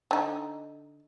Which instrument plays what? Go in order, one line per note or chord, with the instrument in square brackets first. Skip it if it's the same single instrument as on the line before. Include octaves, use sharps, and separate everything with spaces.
[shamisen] D3 D#4